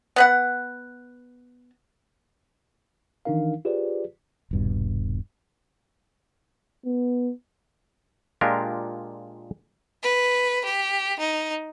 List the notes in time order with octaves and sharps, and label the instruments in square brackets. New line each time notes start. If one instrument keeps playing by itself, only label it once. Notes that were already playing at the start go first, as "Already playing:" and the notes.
[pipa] B3 B4 F#5
[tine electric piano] D#3 E3 D4 D#4 A#4 F5
F4 G4 G#4 B4 C5 D5
[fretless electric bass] D#1 G2 B2
[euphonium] B3
[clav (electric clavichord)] A#2 G#3 D4 F4 G4 A#4
[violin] B4
G4
D#4